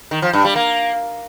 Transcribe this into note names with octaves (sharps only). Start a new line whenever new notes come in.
D#3
F3
G2
G3
A#3